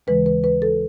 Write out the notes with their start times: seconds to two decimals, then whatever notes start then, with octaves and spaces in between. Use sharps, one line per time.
0.07 D#2 C#3 E3 G#3 B4
0.26 B4
0.44 B4
0.62 A4